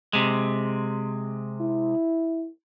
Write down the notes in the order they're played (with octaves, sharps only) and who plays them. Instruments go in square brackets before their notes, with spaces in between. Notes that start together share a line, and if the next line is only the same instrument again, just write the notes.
[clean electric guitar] C3 G#3
[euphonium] E4